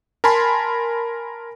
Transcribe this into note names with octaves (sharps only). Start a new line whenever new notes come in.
A#4 G#5 A5 B5 C6